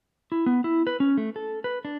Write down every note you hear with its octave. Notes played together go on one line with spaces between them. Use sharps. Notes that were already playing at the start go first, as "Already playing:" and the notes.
E4
B3
E4
B4
C#4
A3
A4
B4
D4